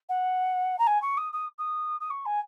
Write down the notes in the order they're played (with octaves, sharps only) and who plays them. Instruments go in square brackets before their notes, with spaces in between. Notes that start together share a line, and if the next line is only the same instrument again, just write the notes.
[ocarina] F#5
A#5
G#5
C#6
D#6
D#6
D#6
D#6
C#6
G#5